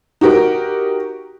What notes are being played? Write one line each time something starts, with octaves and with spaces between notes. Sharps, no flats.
D#4 F#4 G4 A#4